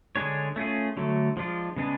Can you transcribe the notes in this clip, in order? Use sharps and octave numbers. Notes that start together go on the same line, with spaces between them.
D3 G#3 D4 G#4 C#5
A3 C#4 F4 G#4
D3 F#3 A3
F3 G#3 D4 F4
C#3 G#3 B3 D4 G#4